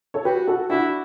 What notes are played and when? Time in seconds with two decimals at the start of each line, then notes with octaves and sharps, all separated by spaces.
0.14 A4 C#5
0.25 F#4 G4 B4
0.47 F#4 A4
0.70 D4 E4 F#4